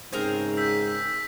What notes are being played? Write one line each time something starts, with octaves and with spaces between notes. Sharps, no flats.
G#2 C#3 C4 G#4 A#4
E6 G6 B6